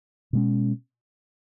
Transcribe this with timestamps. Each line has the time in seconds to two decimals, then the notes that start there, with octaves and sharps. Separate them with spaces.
0.33 B2 G#3 C#4